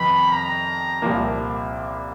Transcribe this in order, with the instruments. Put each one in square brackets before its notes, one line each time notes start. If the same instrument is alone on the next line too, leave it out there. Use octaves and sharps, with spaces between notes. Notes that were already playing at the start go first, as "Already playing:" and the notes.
Already playing: [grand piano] F2 C3 D#3 G3 B3 [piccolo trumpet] B5
[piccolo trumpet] A#5
[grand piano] C2 A#2 F3 A#3